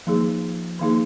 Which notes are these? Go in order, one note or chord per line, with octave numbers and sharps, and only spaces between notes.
D#3 F3 A#3 D#4 G#4
D#3 A#3 D#4 G#4